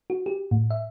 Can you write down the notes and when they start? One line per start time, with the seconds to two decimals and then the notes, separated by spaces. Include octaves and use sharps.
0.10 F#4
0.26 G4
0.51 A2
0.70 E5